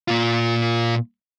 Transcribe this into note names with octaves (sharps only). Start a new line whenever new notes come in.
A#2 F4